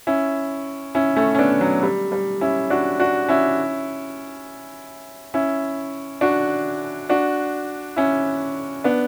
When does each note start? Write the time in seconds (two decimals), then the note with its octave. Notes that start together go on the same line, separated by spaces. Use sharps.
0.07 C#4 E4
0.95 C#4 E4
1.17 A3 C#4
1.35 C#4
1.39 B3 D4
1.61 F#3
1.83 G3
2.12 G3
2.41 C#4 E4
2.70 D4 F#4
3.00 D4 F#4
3.28 C#4 E4
5.34 C#4 E4
6.21 D4 F#4
7.09 D4 F#4
7.96 C#4 E4
8.84 B3 D4